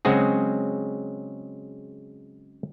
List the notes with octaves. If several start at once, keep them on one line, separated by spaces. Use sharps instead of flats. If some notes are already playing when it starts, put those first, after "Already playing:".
C#3 F#3 G#3 C4 F#4 G#4